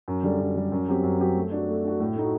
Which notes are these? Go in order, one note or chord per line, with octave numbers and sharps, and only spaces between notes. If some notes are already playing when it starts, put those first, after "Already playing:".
F#2
D3 G3
F#2
D3 G3
F#2
F#3 C4 G4
F#2
F#3 C4 G4
A3
D4 F#4
A3
D4 F#4
A2
A3 D#4 F#4